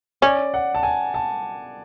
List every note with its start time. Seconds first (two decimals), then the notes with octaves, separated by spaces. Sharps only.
0.22 C#4 D5
0.54 F#5
0.75 A5
0.83 G#5
1.14 A5